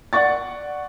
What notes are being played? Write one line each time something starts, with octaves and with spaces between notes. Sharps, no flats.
D5 F#5 C#6 A6